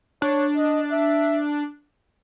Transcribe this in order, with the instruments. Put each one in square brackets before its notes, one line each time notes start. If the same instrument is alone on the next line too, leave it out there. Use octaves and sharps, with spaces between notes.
[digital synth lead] D4 [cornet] C#5
[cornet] D#5
E5